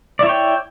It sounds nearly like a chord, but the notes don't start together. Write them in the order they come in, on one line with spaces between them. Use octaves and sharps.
D5 E4 C#5 G5